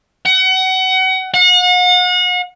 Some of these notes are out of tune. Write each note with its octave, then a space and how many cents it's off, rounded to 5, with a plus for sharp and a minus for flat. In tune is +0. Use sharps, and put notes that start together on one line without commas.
F#5 +30
F#5 -40